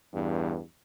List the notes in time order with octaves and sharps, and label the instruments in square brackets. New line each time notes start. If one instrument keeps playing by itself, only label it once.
[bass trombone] E2 [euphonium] G2